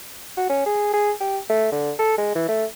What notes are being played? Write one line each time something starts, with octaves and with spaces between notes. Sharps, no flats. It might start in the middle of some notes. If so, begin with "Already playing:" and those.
F#4
C#4
G#4
G#4
G4
A3
D3
A4
G#3
E3
A3